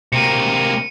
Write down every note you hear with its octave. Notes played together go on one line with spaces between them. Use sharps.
C3 A#3 C#7 D#7